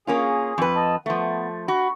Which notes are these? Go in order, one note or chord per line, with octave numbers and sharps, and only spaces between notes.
A#3 C#4 F4 G#4
F2 B4
D#5 A5
F3 A3 B3
F#4 B5